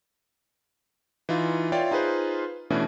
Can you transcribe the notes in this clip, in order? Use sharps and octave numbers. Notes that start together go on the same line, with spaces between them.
E3 D#4 F4
F4 C#5 D5 E5 F5 G5
D#4 F4 G#4 B4 C5
B2 E3 A3 C#4 D4 E4